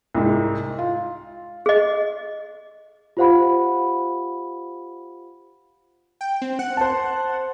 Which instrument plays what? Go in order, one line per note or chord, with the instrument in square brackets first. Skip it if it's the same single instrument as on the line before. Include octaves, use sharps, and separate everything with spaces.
[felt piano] C2 G#2
F4
[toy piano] G#4 D#5
[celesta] F4 G4 C5 F5 F#5 B5
[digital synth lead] G5
C4
F#5
[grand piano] C5 A5